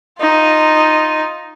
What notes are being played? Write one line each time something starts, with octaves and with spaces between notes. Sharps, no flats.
D#4 F4